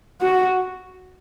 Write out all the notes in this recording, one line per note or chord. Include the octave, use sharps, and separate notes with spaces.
F#4